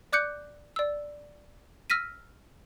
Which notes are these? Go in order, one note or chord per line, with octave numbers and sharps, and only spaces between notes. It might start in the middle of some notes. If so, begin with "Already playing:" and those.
D5 D6 F#6 G6 C#7
D5 E6
E6 F6 A#6 B6 D#7